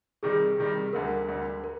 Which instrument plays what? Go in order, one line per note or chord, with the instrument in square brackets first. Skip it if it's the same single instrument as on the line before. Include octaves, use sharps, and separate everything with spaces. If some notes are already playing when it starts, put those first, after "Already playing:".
[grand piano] C3 D#3 G3 [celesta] G#4
[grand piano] C3 D#3 G3
[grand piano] D2 D3 G3 [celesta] A#4
[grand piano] D2 D3 G3
[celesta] A#4